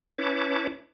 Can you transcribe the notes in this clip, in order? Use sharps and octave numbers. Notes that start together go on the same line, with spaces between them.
C#4 E4 B4 C#5 A5 D6